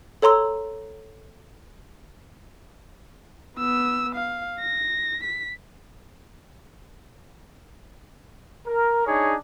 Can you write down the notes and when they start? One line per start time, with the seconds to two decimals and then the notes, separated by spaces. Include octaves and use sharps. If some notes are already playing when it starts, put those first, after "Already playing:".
0.22 A4 C#5 A#5 C6 E6
3.57 B3 E6
4.15 F5
4.60 A#6
5.24 B6
8.68 A#4
9.07 D4 D#4 G#4 C#5